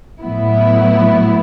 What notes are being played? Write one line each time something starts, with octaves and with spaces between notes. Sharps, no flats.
A2 F#3 B3 E4